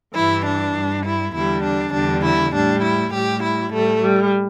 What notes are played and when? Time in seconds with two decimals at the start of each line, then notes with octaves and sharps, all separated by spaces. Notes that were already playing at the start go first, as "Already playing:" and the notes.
0.15 G2 E3 G3 E4
0.45 D4
0.75 G2 G3
1.04 E4
1.33 E2 D3 G3 E4
1.63 D4
1.93 E2 D3 G3 D4
2.23 E4
2.53 A2 G3 D4
2.82 E4
3.12 A2 G3 G4
3.42 E4
3.72 A2 G3 A3
4.02 G3